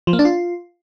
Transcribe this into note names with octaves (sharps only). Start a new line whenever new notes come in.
F3
A#3
D4
F4